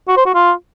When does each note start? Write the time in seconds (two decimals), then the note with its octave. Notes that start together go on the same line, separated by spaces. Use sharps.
0.08 F#4
0.17 C5
0.25 F#4
0.34 F4